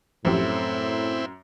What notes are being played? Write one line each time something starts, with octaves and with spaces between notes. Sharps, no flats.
A1 F#2 A2 F3 C4 E4 G4